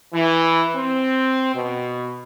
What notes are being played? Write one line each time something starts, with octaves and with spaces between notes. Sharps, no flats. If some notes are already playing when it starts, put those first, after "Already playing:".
E3
C4
B2